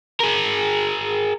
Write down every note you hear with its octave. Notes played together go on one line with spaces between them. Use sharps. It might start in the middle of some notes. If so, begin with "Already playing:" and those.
G#4 A#4